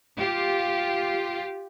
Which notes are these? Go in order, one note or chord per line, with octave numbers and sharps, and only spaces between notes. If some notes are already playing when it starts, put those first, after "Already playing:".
F4 G4